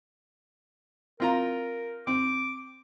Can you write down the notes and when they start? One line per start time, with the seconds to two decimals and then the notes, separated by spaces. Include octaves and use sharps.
1.20 C4 F4 A#4 A#5
2.07 C4 D6